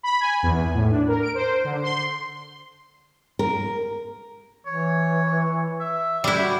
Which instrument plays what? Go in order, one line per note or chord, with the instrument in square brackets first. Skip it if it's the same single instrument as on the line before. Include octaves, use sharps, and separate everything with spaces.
[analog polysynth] B5
G#5
E2
A2
D4
A#4
D7
C5
D3
C6
[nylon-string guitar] A#4
[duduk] E3 [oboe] C#5
[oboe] E5
[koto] G3 E4 [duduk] G4
[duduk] F#4